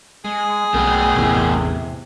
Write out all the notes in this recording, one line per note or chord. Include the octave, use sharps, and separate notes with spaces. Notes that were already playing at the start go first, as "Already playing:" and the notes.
G#3 G#4
B1 A3 B3 G5
A1 E2 C3